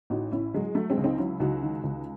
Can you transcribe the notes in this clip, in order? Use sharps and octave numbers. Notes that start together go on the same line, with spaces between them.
A1 D#4 F#4
A1 C#4 E4
F#3 G#3
F#3 A3
G#3 C4
C#2
C4 D#4
F#3 C#4 E4
C#2 D#4 F#4
D#3
C#2